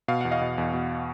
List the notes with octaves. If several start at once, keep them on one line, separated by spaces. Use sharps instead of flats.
B2 F5
E2 F#5
D#5 F5
B2
E2
B2